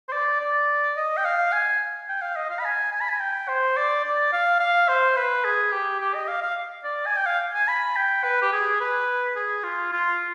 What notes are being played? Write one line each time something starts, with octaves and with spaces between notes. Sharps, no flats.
C5
D5
D5
D#5
G5
F5
G#5
G5
F5
D#5
F5
B5
G#5
G#5
B5
G#5
G5
C5
D5
D5
F5
F5
C5
B4
G#4
G4
G4
D#5
F5
F5
D5
G#5
G5
F5
G#5
B5
G5
B4
G4
G#4
B4
G#4
F4
F4